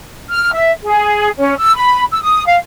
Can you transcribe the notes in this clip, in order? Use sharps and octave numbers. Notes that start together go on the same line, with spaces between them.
F6
E5
G#4
C#4
E6
B5
E6
D#6
F5